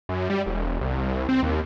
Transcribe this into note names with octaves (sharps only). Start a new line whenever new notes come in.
F#2
G3
E1
C2
C2
C4
D#2